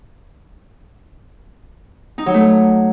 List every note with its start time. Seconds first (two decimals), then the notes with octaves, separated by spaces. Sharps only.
2.18 D#4
2.26 F#3
2.34 A3